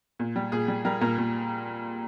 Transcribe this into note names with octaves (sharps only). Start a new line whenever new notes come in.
A#2
G3
A#2 G#4
G3
G3 A#4
A#2 A#4
A#2